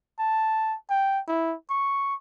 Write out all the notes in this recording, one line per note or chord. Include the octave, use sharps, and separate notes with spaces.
A5
G5
E4
C#6